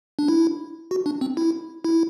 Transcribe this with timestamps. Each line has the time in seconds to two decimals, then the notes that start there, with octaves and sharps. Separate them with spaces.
0.19 D4
0.28 E4
0.91 F#4
1.06 D4
1.21 C4
1.37 E4
1.84 E4